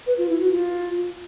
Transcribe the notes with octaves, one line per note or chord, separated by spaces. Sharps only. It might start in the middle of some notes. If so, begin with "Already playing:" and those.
B4
F4
E4
F#4
F4